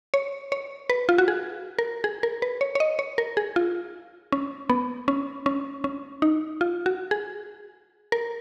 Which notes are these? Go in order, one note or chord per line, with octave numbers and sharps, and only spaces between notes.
C#5
C#5
B4
F4
F#4
G#4
A#4
G#4
A#4
B4
C#5
C#5
D#5
C#5
A#4
G#4
F4
C#4
B3
C#4
C#4
C#4
D#4
F4
F#4
G#4
A#4